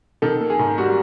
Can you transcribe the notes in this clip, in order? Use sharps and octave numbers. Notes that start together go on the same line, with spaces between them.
D#3 A4
A#3
G#4
G#2
G3 F#4